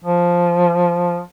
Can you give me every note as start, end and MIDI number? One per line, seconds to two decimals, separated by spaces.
0.04 1.19 53